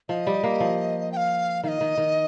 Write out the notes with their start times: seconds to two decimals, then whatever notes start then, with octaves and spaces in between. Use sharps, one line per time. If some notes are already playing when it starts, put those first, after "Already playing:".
0.09 F3 D#5
0.27 G3
0.43 A#3
0.60 F3
1.12 G5
1.17 F5
1.63 D#3 F5
1.68 D#5
1.81 D#3
1.97 D#3